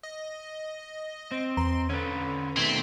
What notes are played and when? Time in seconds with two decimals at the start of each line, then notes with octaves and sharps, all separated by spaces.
0.03 D#5
1.32 C4
1.57 E2 A#5 C6
1.90 D3 C#4 B4
2.57 B2 D#3 A3 C4 G#6 B6